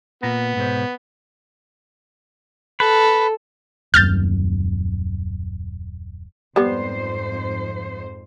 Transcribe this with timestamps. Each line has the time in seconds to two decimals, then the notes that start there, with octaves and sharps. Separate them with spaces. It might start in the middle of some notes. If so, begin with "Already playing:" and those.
0.23 A#2 A#3 B3 A#5
0.56 G#2 B2 C5
2.80 A4 B4
3.94 D#1 F#2 F6 G6 A6
6.56 F2 G#2 G3 B3 C5